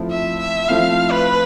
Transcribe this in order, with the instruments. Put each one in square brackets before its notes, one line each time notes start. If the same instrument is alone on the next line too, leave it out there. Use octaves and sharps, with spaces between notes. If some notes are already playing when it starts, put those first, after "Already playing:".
Already playing: [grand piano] F3 A3 C4 E4
[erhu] E5
E5
[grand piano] F3 A3 C4 E4 [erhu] F5
[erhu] B4